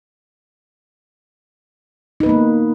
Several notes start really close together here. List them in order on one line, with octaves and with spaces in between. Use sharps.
D#4 B4 B3 A#3